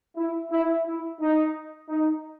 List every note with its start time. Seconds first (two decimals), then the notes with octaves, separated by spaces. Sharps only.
0.16 E4
0.51 E4
0.86 E4
1.20 D#4
1.89 D#4